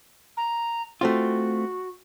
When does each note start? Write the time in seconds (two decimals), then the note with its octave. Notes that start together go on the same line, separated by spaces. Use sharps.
0.37 A#5
1.01 A3 C4 F4 F#4